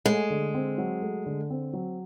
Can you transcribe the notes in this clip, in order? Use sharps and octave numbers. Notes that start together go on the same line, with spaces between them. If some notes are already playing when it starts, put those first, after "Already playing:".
G#3 A3
D3
C4
F#3
A3
D3
C4
F#3